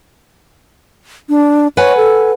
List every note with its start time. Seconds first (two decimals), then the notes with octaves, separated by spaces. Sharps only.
1.29 D4
1.77 B4 C#5 F#5 G#5
1.97 A4